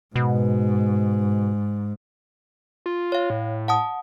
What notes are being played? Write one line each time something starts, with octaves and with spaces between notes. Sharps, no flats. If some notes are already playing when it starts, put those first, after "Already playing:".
G#2 B2
F4
C#5 F5
A2
F#5 A5 D#6